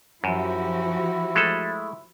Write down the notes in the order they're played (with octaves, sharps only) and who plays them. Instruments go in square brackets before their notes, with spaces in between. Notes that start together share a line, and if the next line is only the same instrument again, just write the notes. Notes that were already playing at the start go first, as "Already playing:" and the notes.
[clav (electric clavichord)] F#2 [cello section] F3 F#4 G4 [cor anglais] E4
[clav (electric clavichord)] G#3 A3 A4